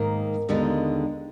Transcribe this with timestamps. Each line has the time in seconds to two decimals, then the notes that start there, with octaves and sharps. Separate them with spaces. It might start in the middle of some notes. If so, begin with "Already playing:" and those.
Already playing: G#2 D#3 A#3
0.49 D#2 D3 G#3 B3 D#4